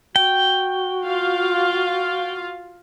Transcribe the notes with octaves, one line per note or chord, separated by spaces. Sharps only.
F#4 G5
F4 F5